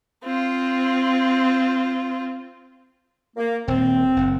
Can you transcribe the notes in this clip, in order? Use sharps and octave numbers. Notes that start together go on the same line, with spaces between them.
C4 F4
A#3
D#1 A#2 C4
F#1